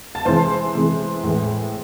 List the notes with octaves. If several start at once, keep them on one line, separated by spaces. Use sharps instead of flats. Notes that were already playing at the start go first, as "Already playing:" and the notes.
A5
C3 E3 G#3 C5 C6
C3 E3 G#3
A2 E3 G#3